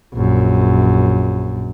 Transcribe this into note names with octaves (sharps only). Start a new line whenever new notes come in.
A#1 F#2